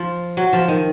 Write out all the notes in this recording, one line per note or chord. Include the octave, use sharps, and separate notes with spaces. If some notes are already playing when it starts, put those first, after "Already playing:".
Already playing: F3
F#3
F3
D#3